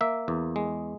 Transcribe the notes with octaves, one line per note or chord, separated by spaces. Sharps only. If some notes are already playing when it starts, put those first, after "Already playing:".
A#3 E5
E2
G#3